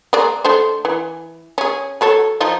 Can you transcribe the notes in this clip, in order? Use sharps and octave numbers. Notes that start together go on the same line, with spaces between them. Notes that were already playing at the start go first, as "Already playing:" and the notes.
G#3 A#3 D5
A3 D4 C5
E3
C#4 G#4
F#3 A4 C#5
F3 D#4 F4